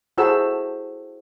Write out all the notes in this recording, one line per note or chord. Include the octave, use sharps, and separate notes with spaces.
E4 F#4 G#4 A4 C5 E6